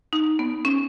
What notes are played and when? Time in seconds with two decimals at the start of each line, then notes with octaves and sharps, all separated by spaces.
0.13 D#4
0.39 B3
0.65 C#4